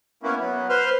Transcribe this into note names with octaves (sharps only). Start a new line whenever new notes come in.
A#3 B3 C#4 E4
F#3 B3
B4 C5 C6 F6